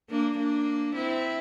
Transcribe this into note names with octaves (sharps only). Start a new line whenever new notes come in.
A#3 D4
A#3 D4
C4 E4